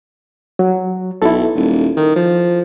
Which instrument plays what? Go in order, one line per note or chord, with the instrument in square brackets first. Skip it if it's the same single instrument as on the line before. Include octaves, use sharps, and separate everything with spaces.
[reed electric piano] F#3
[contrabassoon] B1 [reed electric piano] E4 A4
[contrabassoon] D#1
D#3
F3